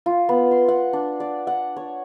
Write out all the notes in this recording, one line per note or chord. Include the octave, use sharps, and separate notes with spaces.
F4
B3
C6
F#5
D4
D5
F#5
C#5